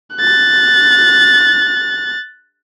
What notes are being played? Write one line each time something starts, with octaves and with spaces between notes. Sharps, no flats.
F#6 A6